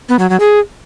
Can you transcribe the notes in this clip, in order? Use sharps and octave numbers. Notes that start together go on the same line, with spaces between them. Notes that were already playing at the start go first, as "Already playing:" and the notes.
B3
F#3
F#3
G#4